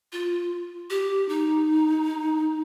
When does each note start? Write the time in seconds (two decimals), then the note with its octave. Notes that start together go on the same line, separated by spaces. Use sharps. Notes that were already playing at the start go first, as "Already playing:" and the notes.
0.12 F4
0.90 G4
1.29 D#4